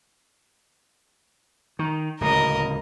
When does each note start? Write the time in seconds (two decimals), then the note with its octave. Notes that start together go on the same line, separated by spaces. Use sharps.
1.79 D#3
2.21 D1 C#2 A#4 D#5